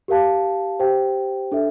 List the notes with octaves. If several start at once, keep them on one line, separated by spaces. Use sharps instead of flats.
G4 A#4 F5 A5
G4 C5 G5
D4 A4 E5